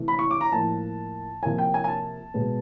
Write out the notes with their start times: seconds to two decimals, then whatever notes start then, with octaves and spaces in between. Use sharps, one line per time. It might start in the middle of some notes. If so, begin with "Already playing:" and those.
Already playing: C3 E3 A3
0.08 B5
0.19 C#6
0.31 D6
0.41 A#5
0.52 A2 F3 A#3 A5
1.43 C3 F3 A#3 G#5
1.58 G5
1.74 G#5
1.84 G#5
1.88 A5
2.34 B2 G#3 B3